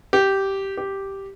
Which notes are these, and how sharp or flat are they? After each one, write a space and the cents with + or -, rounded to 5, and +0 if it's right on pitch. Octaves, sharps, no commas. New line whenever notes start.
G4 -10
G4 -5